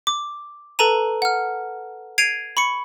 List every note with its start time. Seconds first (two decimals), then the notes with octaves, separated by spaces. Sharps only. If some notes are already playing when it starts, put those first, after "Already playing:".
0.07 D6
0.79 A4 B4 A5 A#5 D#7
1.22 F#5 F6
2.18 G#6 C7 D7 D#7 F7
2.57 B5 C#6 C#7